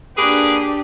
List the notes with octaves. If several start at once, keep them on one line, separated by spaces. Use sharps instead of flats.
A#3 D4 G4 G#4 B4